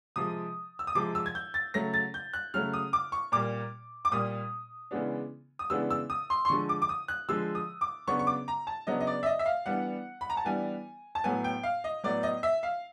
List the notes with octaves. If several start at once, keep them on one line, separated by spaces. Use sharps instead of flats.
C3 F3 G#3 D#6
E6
D#6
C3 F3 G#3 D6
E6
G#6
G6
A6
C#3 F#3 A3 A#6
A6
G6
F#6
C#3 F#3 A3 F6
D#6
D6
C#6
A#2 G3 A#3 D6
D6
A#2 G3 A#3 D#6
C#3 E3 G#3 B3 D4
D#6
C#3 E3 G#3 B3 D4 E6
E6
D#6
C6
C6
D3 F3 G#3 C#6
D6
D6
D#6
F#6
D3 F3 G#3 E6
D#6
D6
C#3 F#3 B3 D4 C#6
C#6
D6
A#5
A5
C#3 F#3 B3 D4 D#5
D#5
D5
E5
D#5
E5
F5
E3 G3 B3 D4 F#5
B5
A#5
A5
E3 G3 B3 D4 G#5
A5
A2 F#3 B3 G#5
G5
F5
D#5
A2 F#3 B3 D5
D#5
E5
F5